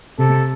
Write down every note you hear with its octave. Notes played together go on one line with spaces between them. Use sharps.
C3 A4